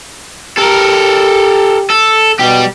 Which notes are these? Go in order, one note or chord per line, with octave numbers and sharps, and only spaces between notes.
G4 A4 A#4
A4
B2 G3 G4